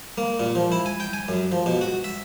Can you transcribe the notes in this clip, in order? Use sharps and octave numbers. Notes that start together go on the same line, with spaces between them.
A#3
A#2
F3
E4
G#5
G5
G#5
F#2
F3
B2
F#4
E5